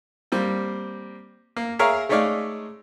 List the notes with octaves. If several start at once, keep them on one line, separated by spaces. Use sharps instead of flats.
G3 A#3 C4
A#3
G#4 A#4 C#5 E5 F5 A#5
G#3 A3 D#4 C#5 D5 F5